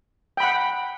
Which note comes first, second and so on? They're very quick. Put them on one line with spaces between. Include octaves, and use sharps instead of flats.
G5 B5 F#5